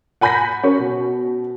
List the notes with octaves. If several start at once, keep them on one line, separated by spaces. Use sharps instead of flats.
F#5 G#5 B5 G6 A#6 B6
C#4 A#4 C#6
B2